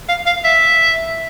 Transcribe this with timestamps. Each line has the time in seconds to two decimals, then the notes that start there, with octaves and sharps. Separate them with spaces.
0.09 F5
0.26 F5
0.44 E5